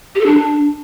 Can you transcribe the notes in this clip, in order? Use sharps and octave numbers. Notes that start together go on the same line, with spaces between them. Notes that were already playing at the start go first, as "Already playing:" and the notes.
G4
A4
D4